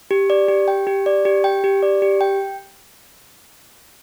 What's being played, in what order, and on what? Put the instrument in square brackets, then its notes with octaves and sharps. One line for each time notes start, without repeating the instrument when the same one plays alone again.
[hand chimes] G4
D5
G4
G5
G4
D5
G4
G5
G4
D5
G4
G5